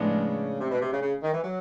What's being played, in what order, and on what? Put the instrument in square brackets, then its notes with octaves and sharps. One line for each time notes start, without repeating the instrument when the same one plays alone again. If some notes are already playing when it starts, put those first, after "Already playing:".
Already playing: [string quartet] A2 F3 G#3 B3 D4 [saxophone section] C#3
[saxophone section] C3
B2
C3
C#3
C#3
D#3
E3
F#3